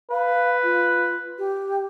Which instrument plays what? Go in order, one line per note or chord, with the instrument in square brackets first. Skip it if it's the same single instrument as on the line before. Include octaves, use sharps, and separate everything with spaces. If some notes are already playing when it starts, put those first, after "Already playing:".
[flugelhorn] B4 [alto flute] F5
[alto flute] F4
G4